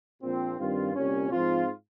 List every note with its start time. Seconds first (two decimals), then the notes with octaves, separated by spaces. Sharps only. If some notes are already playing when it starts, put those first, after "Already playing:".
0.21 A#1 A#2 F3 C4
0.58 G2 D#3 G3 C4 F4
0.95 C2 A#2 G3 C#4
1.31 G#2 F3 C4 F4